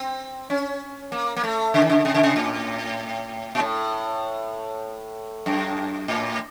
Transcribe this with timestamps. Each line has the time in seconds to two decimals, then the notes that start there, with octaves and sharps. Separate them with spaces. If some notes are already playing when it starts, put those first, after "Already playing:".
Already playing: C4
0.50 C#4
1.12 A#3
1.36 A#3
1.44 A3
1.74 C#3
1.82 D#3
1.90 C#3
2.05 C3
2.14 C#3
2.23 C3
2.36 A2
3.55 A#2
3.60 A2
5.46 F#2
6.08 A2